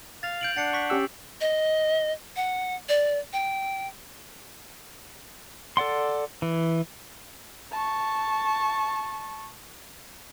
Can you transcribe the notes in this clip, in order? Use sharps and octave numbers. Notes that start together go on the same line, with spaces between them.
F5 A6 F7
G6 D7 F#7
D4 F#5 A6 C7 C#7
C#6 B6
C#4 G4 E6
D#5
F#5
D5
G5
A4 D5 F#5 C6
E3
A5 C#6